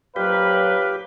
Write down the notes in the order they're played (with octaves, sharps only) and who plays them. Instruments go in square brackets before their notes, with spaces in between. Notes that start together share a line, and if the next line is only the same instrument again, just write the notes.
[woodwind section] F2 A#2 F#3 [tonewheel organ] G4 [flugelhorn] B4 [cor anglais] F5